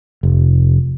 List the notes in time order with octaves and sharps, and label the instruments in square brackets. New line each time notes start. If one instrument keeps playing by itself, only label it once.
[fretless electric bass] F1